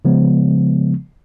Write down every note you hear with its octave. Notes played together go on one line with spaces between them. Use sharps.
C#3 F3 G#3 B3